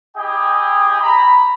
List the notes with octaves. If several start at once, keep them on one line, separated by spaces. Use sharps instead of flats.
E4 G4 G#4 D#5 G5 G#5
A#5 B5